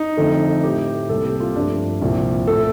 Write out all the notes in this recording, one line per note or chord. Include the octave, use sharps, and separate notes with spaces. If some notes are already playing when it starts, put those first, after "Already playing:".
Already playing: D#4
F2 D3 A3
A2 A3 G4
C2 C3 G3 A#3 A4
G4
F4
G2 F3 A3 D4
C2 A#2 F3
A#2 A3 A4